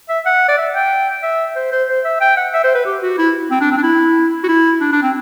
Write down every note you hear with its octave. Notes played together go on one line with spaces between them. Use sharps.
E5
F#5
D5
E5
G5
E5
C5
C5
C5
E5
G5
F#5
E5
C5
B4
G4
F#4
E4
C4
D4
C4
D4
E4
F#4
E4
D4
D4
C4